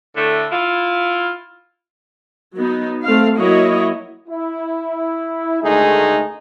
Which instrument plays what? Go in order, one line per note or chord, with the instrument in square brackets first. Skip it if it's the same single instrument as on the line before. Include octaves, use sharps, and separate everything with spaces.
[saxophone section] A2 D3 A3
E4 F4
[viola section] F#3 B3 D#4
A3 C4 F5
F#3 A#3 E4 F#4 C#5 D#5
[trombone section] E4
D2 D#3 G#3 A3 D#4 G#4